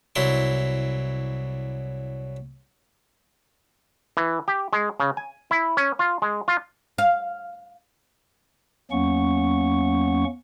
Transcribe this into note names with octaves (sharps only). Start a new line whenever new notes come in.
C2 F#3 E4 C6
E3
G4
G#3
C#3
G#5
E4
C#4
F4
G#3
F4
F5
E2 F#3 A#3 C#4 F#5 C#6